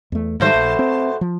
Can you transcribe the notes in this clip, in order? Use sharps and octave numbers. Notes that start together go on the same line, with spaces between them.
E2 A3
G#2 B2 D#3 G3 A3 C5
A#1
C4
F3